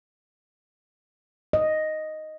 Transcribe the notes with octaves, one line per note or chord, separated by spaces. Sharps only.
D#5